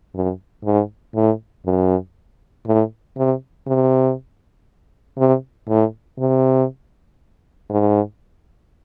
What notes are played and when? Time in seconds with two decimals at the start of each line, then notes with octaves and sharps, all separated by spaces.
0.14 F#2
0.65 G#2
1.15 A2
1.65 F#2
2.66 A2
3.17 C3
3.67 C3
5.18 C3
5.68 A2
6.19 C3
7.70 G#2